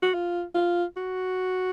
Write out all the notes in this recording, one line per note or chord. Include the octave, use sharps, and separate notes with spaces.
F#4
F4
F4
F#4